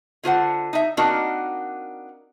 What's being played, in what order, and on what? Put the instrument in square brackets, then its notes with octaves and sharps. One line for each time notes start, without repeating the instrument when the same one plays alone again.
[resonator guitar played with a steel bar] D3 F4 C5 F#5
D#4 E5
A#3 C4 D4 D#4 F#4 A#4